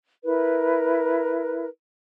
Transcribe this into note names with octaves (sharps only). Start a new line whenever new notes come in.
E4 A#4 B4